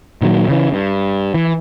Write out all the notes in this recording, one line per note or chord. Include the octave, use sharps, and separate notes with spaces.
A#2 D#3 E3 F#3
C#3 E3
G2
E3